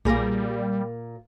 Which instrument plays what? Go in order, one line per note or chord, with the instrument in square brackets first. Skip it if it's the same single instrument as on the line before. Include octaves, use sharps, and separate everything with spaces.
[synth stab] B1 G#4 A#6 [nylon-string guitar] A#2 A#3 [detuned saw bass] G3